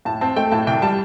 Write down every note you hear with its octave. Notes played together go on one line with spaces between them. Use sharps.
A2 A5
C4 A5
A3 G5
A2 A5
C2 G5
G3 A5